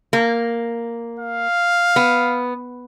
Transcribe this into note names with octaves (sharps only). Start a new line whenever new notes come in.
A#3
F5
B3